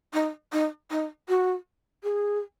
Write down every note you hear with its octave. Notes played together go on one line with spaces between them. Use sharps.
D#4
D#4
D#4
F#4
G#4